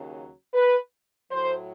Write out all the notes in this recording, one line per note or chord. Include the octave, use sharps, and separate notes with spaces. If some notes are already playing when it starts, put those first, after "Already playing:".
Already playing: D#2 C#3 F#3
B4
A2 F#3 C5